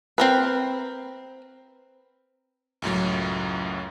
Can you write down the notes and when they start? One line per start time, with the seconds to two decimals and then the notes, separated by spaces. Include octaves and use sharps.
0.18 C4 A#4 B4
2.82 C#2 F#2 A2 F#3